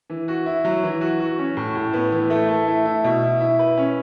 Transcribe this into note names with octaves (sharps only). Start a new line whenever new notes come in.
E3
F#4
E4
F#3
E3
F#4
F#4
C#4
A2
A2
B3
E3
A3
A3
E4
E4
B2
E4
E4
B4
C#4